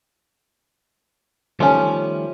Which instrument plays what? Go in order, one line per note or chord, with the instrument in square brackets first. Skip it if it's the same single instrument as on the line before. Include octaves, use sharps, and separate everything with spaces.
[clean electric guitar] D#3 G3 A3 [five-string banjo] F3 C#4